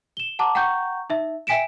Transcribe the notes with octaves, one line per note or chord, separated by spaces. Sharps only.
E7 G7
F#5 A5 A#5 D6
F#5 G5 A#5 C#6 G6
D#4 E5
E5 G5 G#5 B6 D7 E7